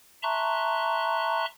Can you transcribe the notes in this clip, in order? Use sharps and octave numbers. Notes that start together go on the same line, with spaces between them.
E5 A5 A#5 C6 C#6 F#6